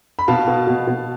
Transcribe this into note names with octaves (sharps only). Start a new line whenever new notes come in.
B5
B2 F5 A5
B2
B2
B2